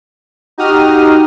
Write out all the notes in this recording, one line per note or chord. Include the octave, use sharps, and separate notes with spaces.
D#4 F#4 G4 D#6 F6